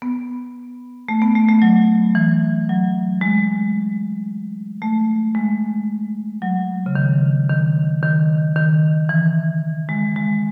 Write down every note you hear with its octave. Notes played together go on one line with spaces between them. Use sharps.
B3
A3
B3
A3
A3
F#3
E3
F#3
G#3
A3
G#3
F#3
C#3
D#3
D#3
D#3
D#3
E3
G#3
G#3